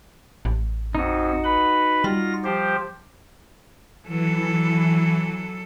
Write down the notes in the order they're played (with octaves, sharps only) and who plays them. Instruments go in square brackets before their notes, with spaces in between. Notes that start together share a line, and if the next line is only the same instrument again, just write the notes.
[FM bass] A1
[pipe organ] F2 [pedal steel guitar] D#4 F#4
[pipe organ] B4 B5
[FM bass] G3 [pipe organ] F4 A#6
[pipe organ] F3 G4 C5
[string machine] E3 [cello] F#3 A4